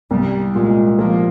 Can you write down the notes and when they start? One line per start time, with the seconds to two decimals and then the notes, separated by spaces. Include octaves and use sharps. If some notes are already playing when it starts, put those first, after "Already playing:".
0.11 C2 G3
0.54 A#2 G#3
0.99 F3 A#3